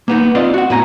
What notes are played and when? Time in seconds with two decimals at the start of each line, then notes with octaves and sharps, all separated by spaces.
0.08 A#3 B3 D#4
0.35 C4 F4 D5 D#5
0.54 F#4 F#5
0.70 A2 B3 G#5 A#5